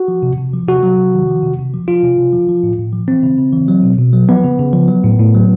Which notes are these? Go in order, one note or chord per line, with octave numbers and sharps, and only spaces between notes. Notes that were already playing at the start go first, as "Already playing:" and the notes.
Already playing: F#4
F3
C3
C3
F3
C3 F#4
F#3
C3
D#3
F3
C3
C3
F3
F3 F4
C3
C3
F3
F3
A2
A2
F3
E3 C4
C#3
C#3
E3
F#3
B2
B2
F#3
F3 B3
C#3
C#3
F3
F#3
A2
A2
F#3